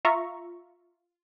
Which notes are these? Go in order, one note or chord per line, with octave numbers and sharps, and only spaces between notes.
F4 E5 A#5 C#6